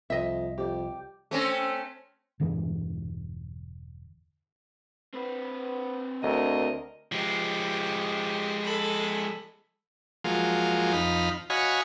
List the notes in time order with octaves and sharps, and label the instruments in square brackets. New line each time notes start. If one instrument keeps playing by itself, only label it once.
[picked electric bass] C2 [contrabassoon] F2 [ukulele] D#5 E5
[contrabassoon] F2 [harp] G4 D5
[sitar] A3 C4 C#4
[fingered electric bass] E1 G2 D3 E3
[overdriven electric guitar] C4 B4
[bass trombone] D2 [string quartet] A#4 [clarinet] D#5
[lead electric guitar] F3 G#3 [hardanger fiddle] G4
[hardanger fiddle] A4 B5
[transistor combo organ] F3 F#3 G#3 A#3 F4
F2 D#4 F5 B5
F#4 C#5 D#5 F5 G#5 B5